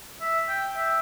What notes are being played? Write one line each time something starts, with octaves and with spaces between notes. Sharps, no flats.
E5
G5
E5